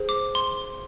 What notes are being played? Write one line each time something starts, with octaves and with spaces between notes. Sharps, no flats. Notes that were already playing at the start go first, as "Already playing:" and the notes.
Already playing: G#4 C5
D6
C6